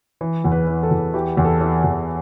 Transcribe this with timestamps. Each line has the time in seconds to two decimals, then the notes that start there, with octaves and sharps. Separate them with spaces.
0.21 E3
0.45 E2
0.52 B4
0.67 E3
0.83 A4
0.91 E2
1.14 E3 G4
1.37 E2
1.45 A4
1.61 E3
1.84 E2